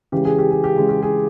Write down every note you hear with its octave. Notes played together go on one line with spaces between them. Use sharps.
C#3 E3 G#3 G4
G#4
G4
G#4
G4
C#3 E3 G#3 G#4
G4
G#4